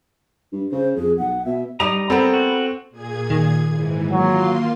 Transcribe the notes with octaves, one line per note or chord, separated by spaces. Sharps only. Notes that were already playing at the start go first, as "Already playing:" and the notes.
G2
C#3 C5
F2 G#4
B1 F#5
B2 E5
G3 D#4 A#5 D#6
B3 C4 A4 A#4
F#4
A#2 G#4 G#6
D#3
G#2 E3
F#3 A#3 F4 C6